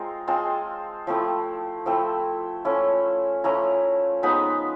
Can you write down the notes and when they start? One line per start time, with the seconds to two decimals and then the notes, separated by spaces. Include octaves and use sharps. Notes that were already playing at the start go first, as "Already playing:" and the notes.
Already playing: G#3 C4 F4 A#5
0.27 G#3 C4 F4 A5
1.07 F3 A3 C4 E4
1.86 F3 A3 C4 E4
2.65 F3 A3 C#4 E4
3.44 F3 A3 C#4 E4 A#5
4.23 F3 G#3 B3 D#4 B5